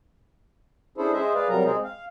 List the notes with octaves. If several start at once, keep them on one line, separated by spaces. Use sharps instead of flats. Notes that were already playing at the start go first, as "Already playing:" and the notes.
C#4 D4 E4 G#4 A4 C5
G#3 G#4 C5 D#5 E5
G#4 B4 D5 F5
C3 F#3 G3 A#4 A#5
G#3 C4 D#4 G#4
F5